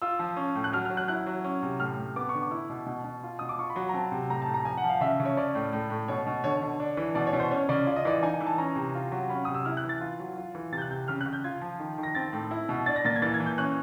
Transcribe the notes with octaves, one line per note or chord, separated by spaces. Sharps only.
F4 E6
F3
C#4
A2
F#6
F#3 F6
F6
F#3
F#6
E4 F#6
F#3
C#4
C3
A2 F6
A2
B3 D6
C#6
D3
D6
E4
B2
B2
B2
F4
B2 D#6
D6
F4 C#6
B5
F#3
A#5
C4 A5
C3
A2 A#5
A5
A2
A#5
F3 G#5
F#5
F3
F5
C#3 E5
C#3
C#5
C#4 D5
A2
A2
A2
B2 C#5
B2
D3 C#5
D3
D4
E3
B2 D5
C#5
B2
C5
C#4 C#5
C#3 D5
F4 D5
D#5
E3 D5
D#4 G#5
G#5
E3
A5
C#4 A#5
C3
F4
F#3
C#4 B5
C3 D#6
E6
E4 F6
F#6
E3
A6
F4
F#3
F4
E3
C3 A6
G6
F#6
C3 G6
C#3 F6
F#6
C#3
G6
F4 G#6
F3
D#3
D#3
A#6
C4 A6
A2
E4
B2
D4 A6
A#6
A#2 A6
G#6
E3 A6
G#6
E3
G6
C#4 F#6